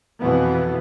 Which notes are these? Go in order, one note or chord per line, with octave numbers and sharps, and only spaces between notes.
F2 B2 E3 B3